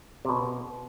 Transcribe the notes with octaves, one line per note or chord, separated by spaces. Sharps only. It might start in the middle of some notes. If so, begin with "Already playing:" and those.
C3
B2